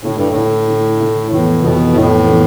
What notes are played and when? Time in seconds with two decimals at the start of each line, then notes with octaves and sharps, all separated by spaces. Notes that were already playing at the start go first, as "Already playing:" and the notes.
0.03 A2 D3 A3 E4
0.16 G2
0.30 A2
0.35 D3 A3 E4
0.67 D3 A3 E4
0.99 D3 A3 E4
1.31 F2 A2 E3 B3
1.63 F2 B2 E3 B3
1.94 F2 A2 E3 B3
2.27 E3 B3